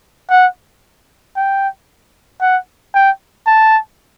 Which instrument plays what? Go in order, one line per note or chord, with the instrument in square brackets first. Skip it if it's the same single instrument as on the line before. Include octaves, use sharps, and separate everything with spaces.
[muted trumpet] F#5
G5
F#5
G5
A5